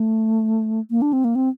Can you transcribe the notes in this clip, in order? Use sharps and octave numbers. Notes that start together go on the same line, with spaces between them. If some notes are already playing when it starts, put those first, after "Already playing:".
Already playing: A3
A#3
D4
C4
A#3
C4